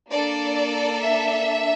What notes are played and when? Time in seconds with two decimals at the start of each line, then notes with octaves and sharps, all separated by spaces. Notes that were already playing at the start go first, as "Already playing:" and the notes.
0.10 A#3 D4 A4 D5
1.01 E5